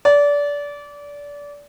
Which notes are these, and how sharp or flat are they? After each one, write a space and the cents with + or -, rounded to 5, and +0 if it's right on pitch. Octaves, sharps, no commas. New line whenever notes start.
D5 -25